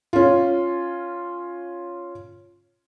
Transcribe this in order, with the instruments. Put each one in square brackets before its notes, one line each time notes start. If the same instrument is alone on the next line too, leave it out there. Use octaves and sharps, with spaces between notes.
[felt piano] C#4 F4